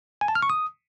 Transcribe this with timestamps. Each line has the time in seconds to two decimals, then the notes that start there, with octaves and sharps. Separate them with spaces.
0.21 G#5
0.28 A5
0.35 F6
0.42 C#6
0.50 D#6